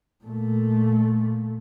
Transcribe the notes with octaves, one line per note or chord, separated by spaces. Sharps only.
A#2 A3